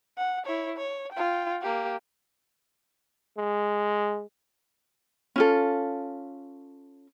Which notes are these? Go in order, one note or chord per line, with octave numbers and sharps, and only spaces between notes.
F#5
E4 C#5
C#5
F4 G5
A#3 G4
G#3
C#4 F4 A4